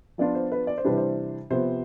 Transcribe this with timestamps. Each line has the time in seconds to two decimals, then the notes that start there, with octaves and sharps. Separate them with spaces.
0.18 F3 B3 D4 F4 D5
0.35 C5
0.52 B4
0.67 D5
0.78 C5
0.84 C3 E3 G3 D4 B4
0.97 C5
1.50 C3 F3 B3 C5